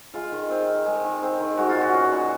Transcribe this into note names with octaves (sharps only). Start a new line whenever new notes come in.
G#3 F4
D#3
C4
D#3
G#3
D#3
C4
D#3
G#3 F#4
F4
A#2
F#4
C#4
A#2